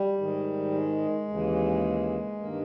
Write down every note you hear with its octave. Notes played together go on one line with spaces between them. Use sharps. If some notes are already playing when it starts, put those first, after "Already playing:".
Already playing: G3
G#2 D#3
G#3
D#2 C#3 E3
G2 D#3 A#3